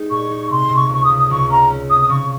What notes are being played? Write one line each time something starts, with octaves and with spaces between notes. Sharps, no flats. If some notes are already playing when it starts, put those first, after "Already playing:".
Already playing: G#3 D#4 G4
A#2 C#6
D#4
C3 C6
C3
C#6
C#2 C#6
D#6
C#2
D#6
C#2 C#6
C#4 A#5
C#4
C3 D#6
D#6
C#3 C#6